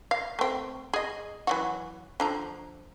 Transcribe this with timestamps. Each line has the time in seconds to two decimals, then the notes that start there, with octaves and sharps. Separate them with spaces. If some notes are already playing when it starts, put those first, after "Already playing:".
0.11 F5
0.39 A3 C4
0.94 G#4 D#5
1.47 E3 F#3 F#4
2.20 D3 F3 A#5